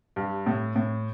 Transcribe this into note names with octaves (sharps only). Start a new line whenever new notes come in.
G2
A2
A2